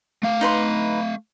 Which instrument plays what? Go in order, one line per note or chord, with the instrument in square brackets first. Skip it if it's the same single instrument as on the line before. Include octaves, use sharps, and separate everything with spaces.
[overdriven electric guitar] A3 F5
[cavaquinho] D#4 B4 C6